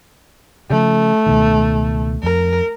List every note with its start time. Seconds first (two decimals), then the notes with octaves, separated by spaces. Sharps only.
0.70 C#3 F3 A3
1.26 C#2 B2 D#3
2.23 F2 A#4